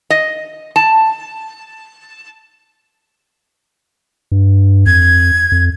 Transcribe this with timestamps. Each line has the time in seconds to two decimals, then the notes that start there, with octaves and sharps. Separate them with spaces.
0.10 D#5
0.76 A5
4.32 G2
4.86 F2 G#6
5.52 F2